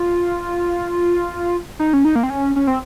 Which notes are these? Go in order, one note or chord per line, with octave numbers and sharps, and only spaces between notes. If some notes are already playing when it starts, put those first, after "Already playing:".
Already playing: F4
D#4
C#4
D#4
A#3
C4
C#4
C#4
C4